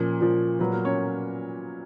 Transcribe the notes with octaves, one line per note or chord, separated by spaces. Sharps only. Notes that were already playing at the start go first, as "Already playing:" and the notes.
Already playing: A#2 F3 C#4
A#2 F3
A#2 F#3 B3 B4
A#3 A#4
C#4 C#5